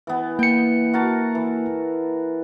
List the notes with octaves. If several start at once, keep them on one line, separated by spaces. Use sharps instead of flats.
E3 B3
A#3 G5 C#7
F#4 A#4 A5
E3